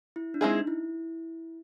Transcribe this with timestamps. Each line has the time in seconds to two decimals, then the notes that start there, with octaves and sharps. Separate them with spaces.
0.16 E4
0.34 D4
0.41 G#3 C4 D#4 E4 G#4
0.67 E4